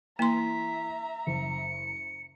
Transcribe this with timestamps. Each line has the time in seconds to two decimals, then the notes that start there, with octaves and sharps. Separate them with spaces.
0.19 E3 A#3 E5 A#5 C6 B6
1.27 F#1 C#7